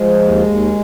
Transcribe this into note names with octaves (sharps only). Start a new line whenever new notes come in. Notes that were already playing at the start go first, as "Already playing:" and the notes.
Already playing: F3 G#3
D#2
D#2